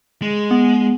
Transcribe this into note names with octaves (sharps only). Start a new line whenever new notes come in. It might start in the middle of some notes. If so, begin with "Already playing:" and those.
G#3
B3